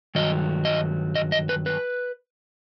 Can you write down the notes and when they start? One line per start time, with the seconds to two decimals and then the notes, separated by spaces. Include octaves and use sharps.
0.15 G2 D#3 F#3 D#5
0.65 D#5
1.16 D#5
1.32 D#5
1.49 B4
1.66 B4